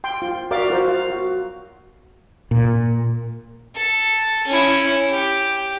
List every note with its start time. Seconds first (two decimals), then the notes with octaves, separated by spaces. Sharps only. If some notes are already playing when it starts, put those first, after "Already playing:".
0.04 G5 C6
0.22 F4
0.51 F#4 A#4 D5 E5 F5 D6
0.70 F4 F#4 A#4 C5
0.86 F5
1.10 F#4
2.51 A#2
3.76 A4
4.47 C#4 E4
5.10 G4